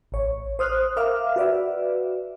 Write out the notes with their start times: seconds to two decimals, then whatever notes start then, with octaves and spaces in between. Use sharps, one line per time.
0.12 A1 C#5
0.59 C5 D#6 F6 F#6
0.97 A#4 E5 F5 D6 F6
1.36 F#4 B4 D5 E5